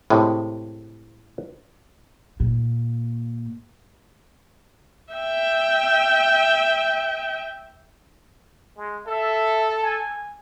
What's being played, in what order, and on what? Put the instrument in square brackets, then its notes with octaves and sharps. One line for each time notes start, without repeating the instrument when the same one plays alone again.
[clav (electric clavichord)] A2 C3 G#3
[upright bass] A#2
[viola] E5 G5
[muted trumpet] G#3
[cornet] A4 [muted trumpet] E5
[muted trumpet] G#5